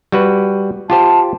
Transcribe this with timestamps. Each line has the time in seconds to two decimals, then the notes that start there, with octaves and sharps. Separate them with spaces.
0.12 G3 F#4 B4
0.90 F4 G4 C5 A5